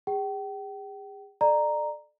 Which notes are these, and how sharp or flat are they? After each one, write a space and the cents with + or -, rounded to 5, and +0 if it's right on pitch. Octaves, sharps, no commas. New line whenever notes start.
G#4 -40 G5 -35
A4 -15 D5 +30 A#5 +0